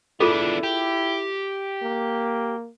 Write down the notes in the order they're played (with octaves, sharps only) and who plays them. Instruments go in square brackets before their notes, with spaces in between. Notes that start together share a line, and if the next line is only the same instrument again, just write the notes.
[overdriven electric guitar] B3 D4 [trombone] E4 [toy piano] F4 G#4 A4
[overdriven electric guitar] G4
[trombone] A#3